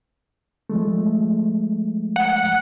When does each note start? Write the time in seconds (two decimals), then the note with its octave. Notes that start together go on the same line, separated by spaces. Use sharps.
0.70 F3 G#3 A3
2.16 F#5